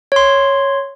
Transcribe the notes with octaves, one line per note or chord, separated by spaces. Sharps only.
C#5 C6